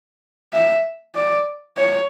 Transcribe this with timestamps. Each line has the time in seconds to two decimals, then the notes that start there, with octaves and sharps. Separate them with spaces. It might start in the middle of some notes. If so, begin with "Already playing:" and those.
0.53 E5
1.15 D5
1.77 C#5